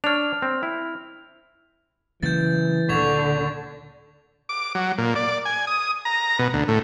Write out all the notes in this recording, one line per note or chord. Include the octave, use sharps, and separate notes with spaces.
D4 C#5 F6 F7
C4
E4
C#3 E3 F#3 A#3 G6 A6
D2 A#2 D3 C#6 G#6 F7
D6
F#3
A#2
D5
G#5
D#6
A#5
B2
D2
A2